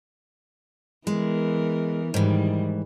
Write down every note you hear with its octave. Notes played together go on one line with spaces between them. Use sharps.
E3 G#3 B3 A#4
G#2 D#3 E3 G3